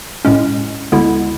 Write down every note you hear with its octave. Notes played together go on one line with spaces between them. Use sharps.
A2 G#3 C#4
D2 D3 G#3 B3 E4